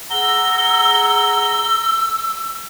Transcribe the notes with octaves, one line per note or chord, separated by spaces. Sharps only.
G#4 F#5 A#5 E6 G7